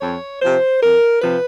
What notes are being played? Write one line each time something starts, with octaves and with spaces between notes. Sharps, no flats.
F2 C#5
C3 F3 C5
F2 A#4
C3 F3 B4